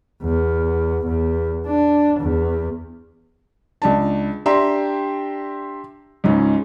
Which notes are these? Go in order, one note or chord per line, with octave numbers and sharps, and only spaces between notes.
E2
E2
D4
E2
C#2 D4 A5
D4 G4 E5 G5 A#5 C6
C#2 G#2 C#4